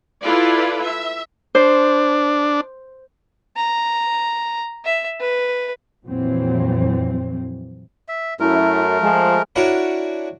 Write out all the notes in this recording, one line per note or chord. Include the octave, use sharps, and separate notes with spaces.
E4 F4 A4 B4 D5
E5
D4 C5
A#5
E5
B4
F2 A#2 E3 F#3 C4
E5
F#2 A3 E4 A#4
F3 G#3
D4 E4 F#4 A#4 C#5